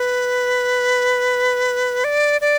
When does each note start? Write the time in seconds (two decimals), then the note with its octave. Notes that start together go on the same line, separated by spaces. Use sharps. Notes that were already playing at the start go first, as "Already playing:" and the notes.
Already playing: B4
2.04 D5
2.41 D5